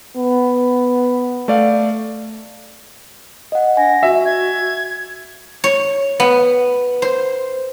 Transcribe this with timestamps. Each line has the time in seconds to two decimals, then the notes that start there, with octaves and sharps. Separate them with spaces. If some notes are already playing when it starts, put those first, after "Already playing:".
0.17 B3
1.48 A3 D5 F5
3.52 D#5 F#5
3.77 D4 G#5 A#6
4.03 F#4 E5
4.25 G#6
5.64 C#5
6.20 B3
7.02 C5